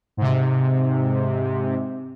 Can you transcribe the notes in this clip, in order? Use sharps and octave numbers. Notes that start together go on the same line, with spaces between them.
G#2 C3